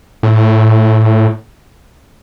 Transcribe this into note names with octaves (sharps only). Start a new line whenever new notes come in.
A2